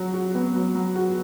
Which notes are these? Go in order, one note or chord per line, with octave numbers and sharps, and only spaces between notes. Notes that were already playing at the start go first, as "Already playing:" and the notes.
Already playing: F#3 F#4
F#4
B3
F#3
F#3
F#4